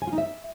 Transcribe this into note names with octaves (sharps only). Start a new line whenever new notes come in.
G#5
F4
D#4
E5